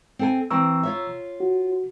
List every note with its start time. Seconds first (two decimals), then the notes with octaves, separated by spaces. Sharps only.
0.19 C4 A4 G#5
0.51 E3 C4 A#5 C#6 E6
0.83 F4 C#5 E5
1.40 F#4